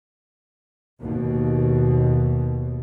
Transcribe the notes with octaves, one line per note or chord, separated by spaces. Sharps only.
D#2 B2